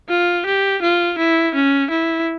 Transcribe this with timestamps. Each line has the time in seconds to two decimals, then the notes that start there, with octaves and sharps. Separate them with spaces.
0.09 F4
0.46 G4
0.82 F4
1.18 E4
1.54 C#4
1.90 E4